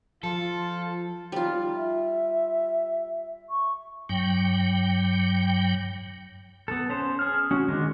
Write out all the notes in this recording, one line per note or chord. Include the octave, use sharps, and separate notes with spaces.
F3 F4 A4
G3 D#4 F4
E5
C#6
G2 F#3 G5
B3 A4
C#4 C5 A5
G#4 F6
C#4 F#4
D#3 G#3 D4